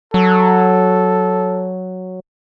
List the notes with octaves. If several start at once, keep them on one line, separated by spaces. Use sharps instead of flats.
F#3 A4